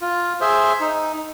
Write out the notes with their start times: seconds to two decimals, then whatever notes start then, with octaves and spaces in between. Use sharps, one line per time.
0.01 F4
0.41 G#4 C5 E5
0.80 D#4